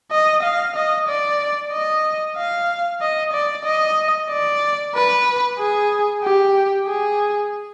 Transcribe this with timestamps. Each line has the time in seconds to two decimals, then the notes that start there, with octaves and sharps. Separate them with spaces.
0.11 D#5
0.43 F5
0.76 D#5
1.08 D5
1.72 D#5
2.37 F5
3.01 D#5
3.33 D5
3.65 D#5
4.30 D5
4.95 B4
5.59 G#4
6.24 G4
6.88 G#4